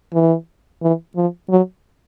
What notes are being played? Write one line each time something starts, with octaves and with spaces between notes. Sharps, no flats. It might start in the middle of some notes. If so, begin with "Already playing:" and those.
E3
E3
F3
F#3